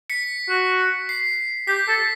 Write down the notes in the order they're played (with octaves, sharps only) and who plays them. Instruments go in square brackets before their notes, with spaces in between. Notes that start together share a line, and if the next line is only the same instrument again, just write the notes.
[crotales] B6 C#7
[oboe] F#4
[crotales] C7
[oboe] G4 [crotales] B6
[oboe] A4